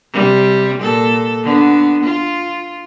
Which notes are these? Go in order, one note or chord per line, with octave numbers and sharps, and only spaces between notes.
C3 G3
A#2 A4
D3 B3
F4